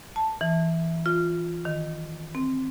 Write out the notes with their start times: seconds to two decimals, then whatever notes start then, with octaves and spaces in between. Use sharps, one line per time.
0.16 A5
0.41 E3
1.06 F4
1.65 D#3
2.35 C4